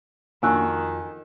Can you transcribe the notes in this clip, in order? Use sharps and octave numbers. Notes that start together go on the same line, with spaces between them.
F2 D#3 A#3 D4 F#4 G#5 E6 F#6